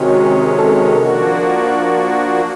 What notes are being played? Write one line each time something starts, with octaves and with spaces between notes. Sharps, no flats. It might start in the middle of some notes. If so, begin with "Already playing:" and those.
Already playing: C3 D#3 G#3 C#4 F#4 G4
G#4
A4
F3 A#3 D4 F#4 A#4